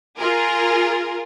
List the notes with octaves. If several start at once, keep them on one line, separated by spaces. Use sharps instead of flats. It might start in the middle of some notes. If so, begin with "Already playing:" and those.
F4 G#4 A#4